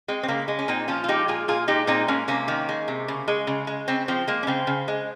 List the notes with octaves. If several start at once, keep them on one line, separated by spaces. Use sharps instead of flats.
G#3 C4
C4
C#3 A#3
G#3
C#4
A#2 C4 D#4
F3 C#4 F4
F4
G#3 D#4 G4
A#2 F4 G#4
A#2 F4 G#4
G#3 D#4 G4
A#2 C4 D#4
G#3 A#3 C#4
C3 A#3 C#4
D#3
G#3
C3
C#3
G#3
C#3
G#3
C#3 C4
F3 C4
G#3 A#3
C#4
C#3 C4
C#3
G#3